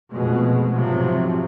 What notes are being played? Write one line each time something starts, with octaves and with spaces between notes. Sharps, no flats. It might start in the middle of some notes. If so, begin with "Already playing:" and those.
F1 F2 B2 G#3
G#2 C3 F3 F#3